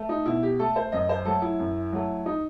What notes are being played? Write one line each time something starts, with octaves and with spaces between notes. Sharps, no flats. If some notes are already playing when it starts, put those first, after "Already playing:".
Already playing: A3
D#4
B2 E4
G4
A3 A4
C5
F#2 D#5
C5
F#3 A3 A4
E4
F#2
F#3 A3
D#4